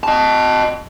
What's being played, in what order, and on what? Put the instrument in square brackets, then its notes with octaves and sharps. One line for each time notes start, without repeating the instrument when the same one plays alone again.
[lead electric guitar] D#5 A5